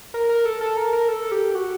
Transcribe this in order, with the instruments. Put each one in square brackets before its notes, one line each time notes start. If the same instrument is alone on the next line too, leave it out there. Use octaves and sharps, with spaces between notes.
[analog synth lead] A#4
A#4
A4
A4
A#4
A#4
A4
G4
F#4